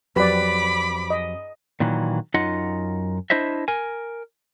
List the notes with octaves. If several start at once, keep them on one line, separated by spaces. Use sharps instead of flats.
F2 F#3 G4 B4 D5 B5 D6
D#5
A#2 D#3 E3 F#3
F#2 D#4 F4 D#5 F#5
D4 E4 C5 D#5 E5
A#4 G#5